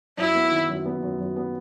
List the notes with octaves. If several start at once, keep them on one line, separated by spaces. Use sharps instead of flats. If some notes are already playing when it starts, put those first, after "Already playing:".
F#2 E4
B3
D#3
F#2
B3
F#2
F#2
B3